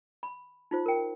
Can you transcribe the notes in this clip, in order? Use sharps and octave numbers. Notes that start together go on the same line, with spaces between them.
B5
D#4 F4 C5
A#4 G5